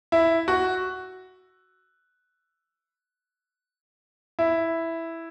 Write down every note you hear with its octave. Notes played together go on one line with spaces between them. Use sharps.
E4
F#4
E4